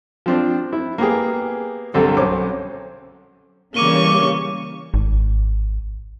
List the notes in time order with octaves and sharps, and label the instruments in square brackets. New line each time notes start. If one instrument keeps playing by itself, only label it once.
[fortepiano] F3 C4 D4
E4
A#3 B3 G4 G#4
C2 D3 C4 A4
B1 C#4 C5 D6
[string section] C#3 E3 G3 [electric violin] A#3 C#6 [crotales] D6 D#7 G7
[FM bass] G#1